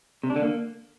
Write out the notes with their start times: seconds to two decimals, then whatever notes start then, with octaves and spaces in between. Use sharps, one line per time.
0.24 C3
0.30 D4
0.36 D3
0.42 A#3